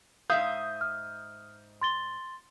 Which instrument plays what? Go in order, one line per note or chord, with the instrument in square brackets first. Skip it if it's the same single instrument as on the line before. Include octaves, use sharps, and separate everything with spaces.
[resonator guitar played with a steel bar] G#2 E5 F5 [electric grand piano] D#6 G6
[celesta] F6
C6 A6 G7